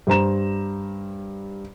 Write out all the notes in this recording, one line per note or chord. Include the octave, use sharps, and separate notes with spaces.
G2 C5 A#5 E7